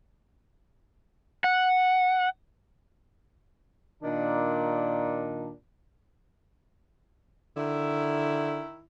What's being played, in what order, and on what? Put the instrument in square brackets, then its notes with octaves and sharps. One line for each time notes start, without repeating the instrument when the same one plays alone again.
[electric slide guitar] F#5
[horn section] A#2 D#3 D4
[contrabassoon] D3 [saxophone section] D#3 E4